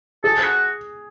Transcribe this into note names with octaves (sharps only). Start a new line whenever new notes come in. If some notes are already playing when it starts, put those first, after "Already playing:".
G#4 A4
F#4